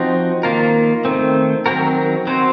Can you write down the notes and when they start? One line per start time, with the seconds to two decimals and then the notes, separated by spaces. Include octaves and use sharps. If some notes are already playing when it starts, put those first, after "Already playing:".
Already playing: F3 C4 D#4 F#4
0.43 D#3 A#3 F4 A#4
1.05 D#3 A3 C4
1.66 D#3 F#3 C4 F#4 A#4
2.27 F#3 C4 F#4 C5